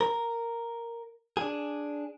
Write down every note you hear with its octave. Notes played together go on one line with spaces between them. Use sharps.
A#4
D4 G#4